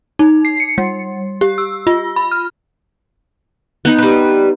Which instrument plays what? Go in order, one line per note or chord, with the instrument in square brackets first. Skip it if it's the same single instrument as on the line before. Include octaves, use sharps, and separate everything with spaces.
[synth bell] D#4
C7
C#7
G3
G4
E6
F4
B5
F6
[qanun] B3 D#4
[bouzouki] G3 B4